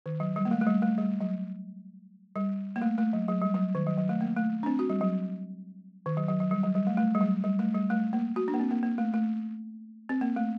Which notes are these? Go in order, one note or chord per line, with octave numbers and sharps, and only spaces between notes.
D#3
F#3
G3
A#3
A3
A3
G3
A3
G3
F#3
G3
A#3
A3
A3
F#3
F#3
G3
F#3
D#3
F#3
F#3
A3
A#3
A3
D4
C4
F#4
G3
F#3
D#3
F#3
F#3
F#3
G3
F#3
G3
A3
A3
G3
F#3
G3
A3
G3
A3
A#3
F#4
D4
A#3
C4
A#3
A#3
A3
A3
C4
A#3
A3